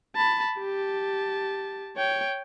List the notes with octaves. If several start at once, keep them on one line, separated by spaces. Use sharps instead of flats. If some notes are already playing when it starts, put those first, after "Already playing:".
A5 B5
G4 A5
C#5 G5